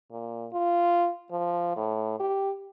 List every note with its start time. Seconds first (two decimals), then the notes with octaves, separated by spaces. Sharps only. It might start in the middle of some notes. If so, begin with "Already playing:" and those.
0.12 A#2
0.53 F4
1.32 F3
1.77 A2
2.20 G4